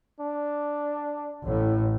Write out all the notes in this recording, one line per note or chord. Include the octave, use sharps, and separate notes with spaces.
D4
A1 A2